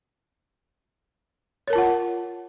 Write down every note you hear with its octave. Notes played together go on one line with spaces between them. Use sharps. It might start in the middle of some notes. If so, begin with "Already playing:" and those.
F4 A#4 C#5 F#5 A5